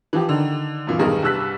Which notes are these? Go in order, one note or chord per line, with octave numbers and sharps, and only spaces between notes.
E3 F3 G4
D3 D#3
F#2 A#2 E3
B1 E2 G2 D#3 G#4 A#4
C2 G2 E6 F#6 B6